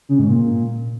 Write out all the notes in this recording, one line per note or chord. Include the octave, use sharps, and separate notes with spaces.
C#3
G#2
A#2